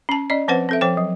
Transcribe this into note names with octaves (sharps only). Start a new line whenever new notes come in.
C#4 A5
C#4 D5 D#5
F3 C4 B4 C5 F#5
C4 A4 E5
F3 C5 G5
F#3